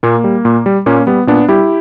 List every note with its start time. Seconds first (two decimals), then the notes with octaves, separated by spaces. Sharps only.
0.03 A#2 A#3
0.24 G3
0.45 A#2
0.66 G3
0.86 A#2 A#3 C#4
1.07 G3 B3
1.27 A#2 B3 D4
1.48 G3 E4 G4